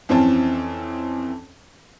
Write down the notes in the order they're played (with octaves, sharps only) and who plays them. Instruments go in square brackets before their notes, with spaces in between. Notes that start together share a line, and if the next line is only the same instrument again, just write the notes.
[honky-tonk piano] F2 E3 C4 C#4 G#5 A5